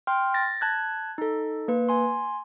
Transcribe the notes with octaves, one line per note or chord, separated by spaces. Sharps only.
G5 C6 F6
A6 A#6
A5 F#6 G#6
D#4 A4
A#3 B4
G#5 C6